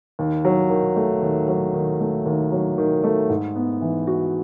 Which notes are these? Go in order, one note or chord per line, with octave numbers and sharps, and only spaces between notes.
D#2
F#3
D#3
A3
D#2
F#3
D#3
A3
D#2
F#3
D#3
A3
G#2
B3
E3
F#4